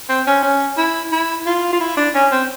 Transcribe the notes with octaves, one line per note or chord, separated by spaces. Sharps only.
C4
C#4
C#4
E4
E4
F4
F4
E4
D4
C#4
C4